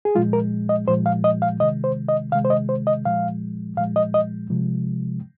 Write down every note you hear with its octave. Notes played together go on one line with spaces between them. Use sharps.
G#4
A#2 F3 G#3 F4
A#4
D#5
A#2 F3 G#3 C5
F5
D#5
F5
C3 D#3 G#3 D#5
C5
D#5
C3 D#3 G#3 F5
C5
D#5
C5
D#5
A#2 F3 G#3 F5
A#2 F3 G#3 F5
D#5
D#5
C3 F3 G#3